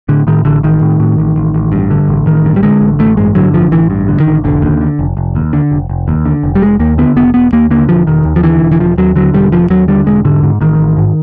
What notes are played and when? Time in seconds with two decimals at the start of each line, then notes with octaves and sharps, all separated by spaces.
0.09 A2 D3
0.27 A2 D#3
0.45 A1 D3
0.63 A1 D#3
0.81 A2
1.00 A2
1.18 A1
1.36 A1
1.54 A1
1.72 G2
1.90 D3
2.09 A1
2.26 A1 D#3
2.45 G2
2.56 G3
2.63 D3 G#3
2.81 A1
2.99 A1 A3
3.17 G2 G#3
3.35 D3 F#3
3.54 A1 F3
3.71 A1 E3
3.90 G2
4.08 D3
4.20 D#3
4.26 A1
4.44 F1 D3
4.62 D#2
4.81 D3
4.99 F1
5.17 F1
5.35 D#2
5.53 D3
5.71 F1
5.90 F1
6.08 D#2
6.26 D3
6.44 F1
6.55 G3
6.62 F1 G#3
6.80 D#2 A#3
6.98 D3 B3
7.16 F1 B3
7.34 E1 B3
7.53 D#2 A#3
7.71 D3 A#3
7.89 E1 F3
8.07 E1 D#3
8.25 D#2
8.36 F3
8.43 D3 E3
8.62 E1
8.72 E3
8.79 E1 F3
8.98 D#2 F#3
9.16 D3 F#3
9.34 E1 G3
9.52 E1 F3
9.70 D#2 F#3
9.88 D3 G3
10.06 E1 G#3
10.25 G#2 D3
10.43 G#2
10.61 A1 D#3
10.79 A1
10.97 G#2